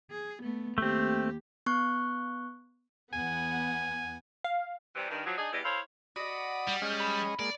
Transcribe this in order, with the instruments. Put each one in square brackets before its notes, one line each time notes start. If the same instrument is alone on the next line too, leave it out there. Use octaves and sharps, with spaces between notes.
[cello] G#4
A3 B3
[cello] D#2 G4 [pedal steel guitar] A3 C4
[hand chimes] B3 C#6 F#6
[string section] E2 B3 F#5 [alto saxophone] G#5
[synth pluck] F5
[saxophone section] C3 E3 G3
G2 D#3
F3 F#3
D4 D#4 G#4
E2 G3 E4 G4 D#5
E4 A4 C5 C#5 F5
[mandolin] F#4 D#5 [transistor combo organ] D5 B5 D#6
[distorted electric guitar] G3
[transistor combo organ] G#3 C#4 D#5 [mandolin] F6 G6
[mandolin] B5
[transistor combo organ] G#3 A#3 [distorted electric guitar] D5